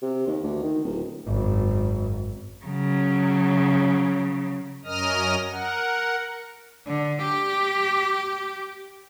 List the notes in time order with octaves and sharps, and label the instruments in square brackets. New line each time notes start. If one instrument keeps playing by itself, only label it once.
[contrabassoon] C3
D#2
D2
D#3
D1
[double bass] G#1 F#2
[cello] C#3 F#3
[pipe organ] F#2 C#4 A#4 D#5 D#6 F6
A#4 F#5
[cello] D3
G4